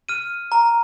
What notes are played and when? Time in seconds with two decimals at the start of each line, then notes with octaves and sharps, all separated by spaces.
0.09 F6 D#7
0.52 A#5